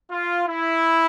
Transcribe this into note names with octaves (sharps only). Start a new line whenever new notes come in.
F4
E4